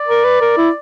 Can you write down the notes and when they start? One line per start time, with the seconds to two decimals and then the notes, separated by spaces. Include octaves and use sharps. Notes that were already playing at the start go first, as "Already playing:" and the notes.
Already playing: D5
0.08 A#4
0.24 B4
0.41 A#4
0.57 E4